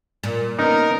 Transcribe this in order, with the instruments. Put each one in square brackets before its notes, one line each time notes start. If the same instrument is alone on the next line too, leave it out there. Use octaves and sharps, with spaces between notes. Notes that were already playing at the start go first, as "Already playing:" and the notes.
[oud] A#2
[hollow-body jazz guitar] B3 C#4 [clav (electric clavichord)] D#4 [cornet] A#4